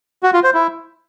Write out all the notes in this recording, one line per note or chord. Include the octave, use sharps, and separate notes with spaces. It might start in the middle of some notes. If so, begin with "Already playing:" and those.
F#4
F4
C5
E4